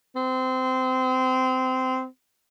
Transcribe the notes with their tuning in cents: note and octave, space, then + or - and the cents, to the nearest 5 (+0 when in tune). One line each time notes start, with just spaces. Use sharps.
C4 -20